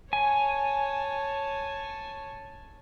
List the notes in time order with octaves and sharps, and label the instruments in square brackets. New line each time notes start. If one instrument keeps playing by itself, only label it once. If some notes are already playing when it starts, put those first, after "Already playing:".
[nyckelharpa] C#5 A5 [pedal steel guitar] G#5